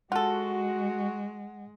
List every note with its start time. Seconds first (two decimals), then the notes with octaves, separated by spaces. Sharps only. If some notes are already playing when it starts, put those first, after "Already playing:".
0.12 G#3 F4 F#4 A4 F#5